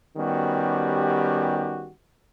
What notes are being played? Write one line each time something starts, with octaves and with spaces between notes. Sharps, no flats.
D#3 G3 B3 C#4 F#4 G4